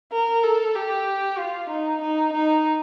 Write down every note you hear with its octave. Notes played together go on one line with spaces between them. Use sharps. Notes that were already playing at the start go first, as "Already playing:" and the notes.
A#4
A4
G4
F4
D#4
D#4
D#4